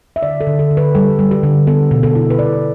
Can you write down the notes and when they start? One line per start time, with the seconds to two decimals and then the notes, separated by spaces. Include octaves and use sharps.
0.16 E5
0.23 D3 D5
0.41 A4
0.47 D3
0.59 A4
0.71 D3
0.77 B4
0.95 G3 A4
1.19 G3
1.31 G4
1.43 D3
1.67 B3 A4
1.91 B2
2.03 A4
2.15 E4
2.30 B4
2.39 B2 D5